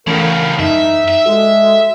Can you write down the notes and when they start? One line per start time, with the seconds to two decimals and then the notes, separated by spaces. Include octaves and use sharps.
0.07 A2 C#3 E3 A3 C#4 A#4
0.59 F#2 D#4 E5
1.08 E5
1.26 G#3 F#4 A4